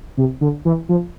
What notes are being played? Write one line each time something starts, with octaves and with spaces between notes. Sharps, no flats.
C3
D3
E3
F3